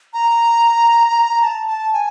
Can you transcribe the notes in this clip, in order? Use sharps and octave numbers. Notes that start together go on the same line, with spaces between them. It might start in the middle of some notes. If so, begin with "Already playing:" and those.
A#5
A5
A5
G#5